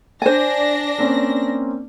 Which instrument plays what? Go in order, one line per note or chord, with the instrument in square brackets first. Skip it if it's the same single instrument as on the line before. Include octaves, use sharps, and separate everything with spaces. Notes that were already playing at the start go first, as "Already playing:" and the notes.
[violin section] D4 A#6 [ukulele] C5 G#5
[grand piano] A#3 C4 C#4